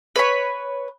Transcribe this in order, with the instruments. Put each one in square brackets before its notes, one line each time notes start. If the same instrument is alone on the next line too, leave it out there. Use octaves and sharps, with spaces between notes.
[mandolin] B4 C#5 B5